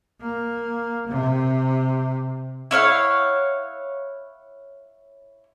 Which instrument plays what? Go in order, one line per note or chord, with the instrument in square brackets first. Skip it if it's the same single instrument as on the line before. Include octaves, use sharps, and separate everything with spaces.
[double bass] A#3
C3
[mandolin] E4 C#5 F5 F#5